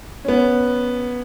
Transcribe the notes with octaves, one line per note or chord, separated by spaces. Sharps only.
B3 C#4